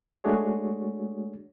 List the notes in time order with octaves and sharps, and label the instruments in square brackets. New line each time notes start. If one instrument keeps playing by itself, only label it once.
[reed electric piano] G#3 A3 D4 F#4 G#4 C#5